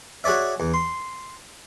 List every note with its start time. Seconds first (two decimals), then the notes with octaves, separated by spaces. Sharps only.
0.24 F#4 G#4 C#5 D5 E5
0.60 E2
0.74 C6